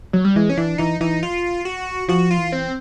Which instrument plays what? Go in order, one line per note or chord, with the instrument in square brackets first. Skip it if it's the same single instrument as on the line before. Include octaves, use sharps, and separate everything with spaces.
[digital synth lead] F#3
G3
[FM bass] E3 [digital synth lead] G#3
[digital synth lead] C#4
[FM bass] E3 [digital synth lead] D4
[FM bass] E3 [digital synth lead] D#4
[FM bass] E3 [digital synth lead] D#4
[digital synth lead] F4
F#4
[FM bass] F3 [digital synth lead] F#4
[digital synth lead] F4
[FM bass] E3
[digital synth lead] C4